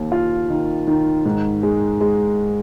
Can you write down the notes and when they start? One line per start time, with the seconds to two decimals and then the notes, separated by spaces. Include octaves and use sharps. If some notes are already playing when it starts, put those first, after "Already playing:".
Already playing: D#2
0.12 F4
0.50 D#3
0.87 D#3
1.25 G#2
1.63 G#3
2.01 G#3